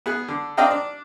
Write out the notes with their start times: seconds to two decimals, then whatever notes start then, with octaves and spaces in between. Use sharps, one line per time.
0.06 B3 G#4 F#6
0.28 D3
0.57 C4 D4 D#5 F5 G5 A#5
0.70 D4